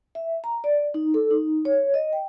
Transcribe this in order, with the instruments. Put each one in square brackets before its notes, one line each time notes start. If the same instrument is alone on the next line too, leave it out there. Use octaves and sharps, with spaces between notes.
[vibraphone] E5
A#5
D5
D#4
A4
D#4
C#5
D#5
G5